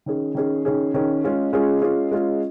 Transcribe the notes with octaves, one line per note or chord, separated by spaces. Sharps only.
D#3 C#4 G#4
D#3 C#4 G#4
D#3 C#4 G#4
D#3 C#4 G#4
G#3 C#4 F4 G#4
G#3 C#4 F4 G#4
G#3 C#4 F4 G#4
G#3 C#4 F4 G#4